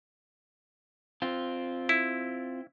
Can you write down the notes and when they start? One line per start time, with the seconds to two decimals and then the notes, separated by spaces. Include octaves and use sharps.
1.22 C4 F4
1.89 E4